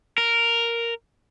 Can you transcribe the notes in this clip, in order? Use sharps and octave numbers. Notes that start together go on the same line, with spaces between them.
A#4